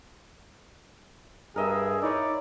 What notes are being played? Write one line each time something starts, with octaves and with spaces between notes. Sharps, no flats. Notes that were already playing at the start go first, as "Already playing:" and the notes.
G2 G#4 A#4 D#5 E5
D#4 E4 C#5 D5